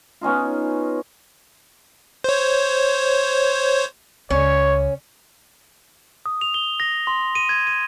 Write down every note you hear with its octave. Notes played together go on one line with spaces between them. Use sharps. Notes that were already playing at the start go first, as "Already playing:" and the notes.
B3 C#4 D#4 F4
C5 C#5
C#2 C#4 C#5
D#6
F7
G7
A#6
C6
D#7
G#6
D#7